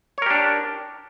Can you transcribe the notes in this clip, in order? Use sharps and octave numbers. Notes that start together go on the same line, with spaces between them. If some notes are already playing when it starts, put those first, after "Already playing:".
D4 G4 A#4 C#5